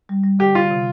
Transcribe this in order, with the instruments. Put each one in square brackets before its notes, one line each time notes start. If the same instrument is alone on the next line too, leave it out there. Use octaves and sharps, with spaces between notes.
[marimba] G3
G3
[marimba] D3 [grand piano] G4
[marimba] D3 [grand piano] F4
[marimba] C3